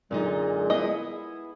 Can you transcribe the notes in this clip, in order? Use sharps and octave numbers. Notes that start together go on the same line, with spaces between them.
F#2 A#2 D3 G#3 D#4
B3 E4 G#4 D#5